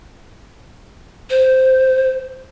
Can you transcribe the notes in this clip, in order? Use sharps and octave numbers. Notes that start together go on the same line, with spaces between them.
C5